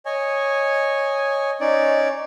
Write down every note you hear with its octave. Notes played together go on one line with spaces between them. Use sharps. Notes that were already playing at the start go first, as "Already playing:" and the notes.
C#5 D#5 G#5
C#4 D#4 D5